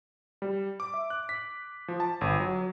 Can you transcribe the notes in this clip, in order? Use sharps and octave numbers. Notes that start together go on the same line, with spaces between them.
G3
D6
E5
F#6
B6
F3
A5
G1
F#3